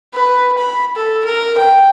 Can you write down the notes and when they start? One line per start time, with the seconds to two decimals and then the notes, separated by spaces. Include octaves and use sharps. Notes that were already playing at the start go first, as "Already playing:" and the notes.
0.14 B4
0.58 B5
0.96 A4
1.25 A#4
1.58 G5